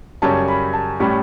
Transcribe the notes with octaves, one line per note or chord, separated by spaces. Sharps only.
F#2 C#3 G3 C#4 A5
B5
A5
A2 G3 C#4 B5